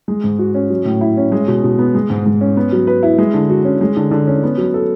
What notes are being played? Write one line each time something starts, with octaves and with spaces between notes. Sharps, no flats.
G#3
G#2
F#4
C#4
F#3
A2
E4
C#4
G#3
B2
B2
B3
G#3
G#2
G#2
C#4
B3
F#3
B4
E4
G#3
D3
F#4
C#4
G#3
D3
D3
C#4
B3
F#3
A4